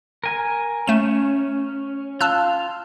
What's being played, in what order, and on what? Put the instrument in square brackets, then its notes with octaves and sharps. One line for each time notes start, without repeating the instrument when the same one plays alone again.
[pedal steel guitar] A#4 G#5
[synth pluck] A3 E7 [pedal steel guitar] C#4
[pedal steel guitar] F4 [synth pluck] A5 E6 F#6